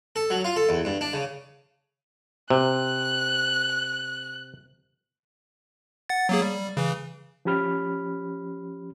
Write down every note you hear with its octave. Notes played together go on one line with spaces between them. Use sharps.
A4
F#3
F4
A4
E2
G2
D4
C#3
C3 F#6
F#5 A6
F#3 A#3 G#4
G3
C#3 E3
F3 C#4 G4 B5 F6